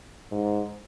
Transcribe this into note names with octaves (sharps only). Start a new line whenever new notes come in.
G#2